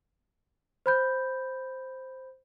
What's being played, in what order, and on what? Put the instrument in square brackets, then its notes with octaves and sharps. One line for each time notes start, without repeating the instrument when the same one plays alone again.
[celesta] C5 B5 G6